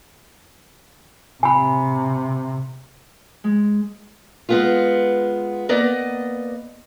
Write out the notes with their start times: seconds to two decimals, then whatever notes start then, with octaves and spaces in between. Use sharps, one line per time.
1.43 C3 G#5 B5
3.44 G#3
4.49 G#3 B3 F4
5.69 A#3 B3 D5 D#5